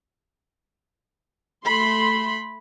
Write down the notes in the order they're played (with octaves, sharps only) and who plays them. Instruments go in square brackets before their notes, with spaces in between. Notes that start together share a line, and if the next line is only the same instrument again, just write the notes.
[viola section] A3 B5 C6